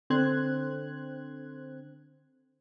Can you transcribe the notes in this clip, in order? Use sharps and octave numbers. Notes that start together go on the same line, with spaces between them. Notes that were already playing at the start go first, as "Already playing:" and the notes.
D3 C4 C5 F#6 G#6